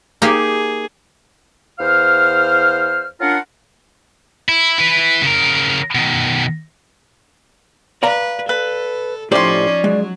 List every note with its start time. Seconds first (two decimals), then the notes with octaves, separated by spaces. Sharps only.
0.22 A#3 D#4 G4 G#4
1.79 E2 C5 F5 F6
3.21 C#4 D4 F4 A#4 F5 F#5
4.49 E4
4.78 E4 B4
5.22 C#3 A#4
5.95 B2 D#3
8.03 B4 D5 F5 A#5
8.49 A4 B4
9.32 A2 F3 C#4 D#4 G4 C5 D5 C6
9.84 F#3 G#3